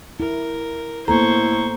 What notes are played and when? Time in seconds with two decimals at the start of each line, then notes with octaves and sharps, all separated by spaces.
0.20 E4 A#4
1.08 A2 A#3 B3 A4 C5 A#5 C#6